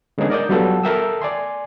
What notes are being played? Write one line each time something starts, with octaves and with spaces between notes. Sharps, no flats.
D3 G#3 B3 C#4 D#4 G#4
A#4 D5 D#6 G6
F#3 G3 B3 F4 F#4 A4
A4 A#4 E5 G5 D#6 E6
D5 G#5 C6